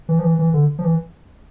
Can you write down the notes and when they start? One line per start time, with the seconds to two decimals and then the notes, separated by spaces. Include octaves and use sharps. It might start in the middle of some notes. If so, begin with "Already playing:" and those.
0.09 E3
0.19 F3
0.23 E3
0.39 E3
0.54 D3
0.79 F3
0.84 E3